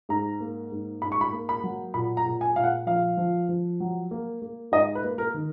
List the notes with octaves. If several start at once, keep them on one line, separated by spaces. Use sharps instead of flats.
G#2 A#5
A#3
G#2
G#2 B5
C#6
B5
A#3
B5
F#3
A#2 B5
A#5
A#2
G#5
A#2 F5
F#5
F3 F5
F3
F3
F#3
A#3
A#3
G#2 D#5
B4
A#3
A#4
D#3